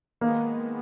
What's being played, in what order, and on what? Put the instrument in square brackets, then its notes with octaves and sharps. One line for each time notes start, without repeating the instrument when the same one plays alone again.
[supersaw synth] D#3 G#3 B3 [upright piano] A#3